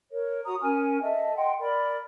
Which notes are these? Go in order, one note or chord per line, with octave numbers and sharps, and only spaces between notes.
A#4 C#5
F#4 A#5 D#6
C#4 A#4 G#5 F6
A4 D#5 E5 A5
D#5 F#5 G5 C6
A#4 D5 B5